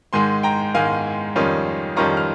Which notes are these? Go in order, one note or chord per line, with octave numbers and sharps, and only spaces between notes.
G#2 D#3 G#3 G#5 C6
G5 A#5
G#2 D#3 G#3 F5 G#5
F2 D#3 G3 C#4 F4
F2 D#3 G3 C#4 F4 A#5 C#6
F6